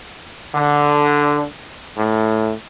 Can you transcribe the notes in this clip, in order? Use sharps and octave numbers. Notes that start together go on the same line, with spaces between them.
D3
A2